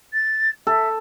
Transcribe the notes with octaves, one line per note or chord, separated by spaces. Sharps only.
A6
A4 E5